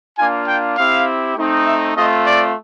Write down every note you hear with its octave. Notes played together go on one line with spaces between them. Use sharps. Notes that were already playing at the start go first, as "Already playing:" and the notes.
A#3 D4 F4 G#5
G5
C4 E4 G4 F5
A3 C4 D#4
E5
A3 C4 F4 D#5
D5